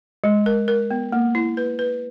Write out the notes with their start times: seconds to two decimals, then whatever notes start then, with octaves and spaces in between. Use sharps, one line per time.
0.24 G#3
0.46 A#4
0.68 A#4
0.91 B3
1.12 A#3
1.35 E4
1.57 B4
1.79 B4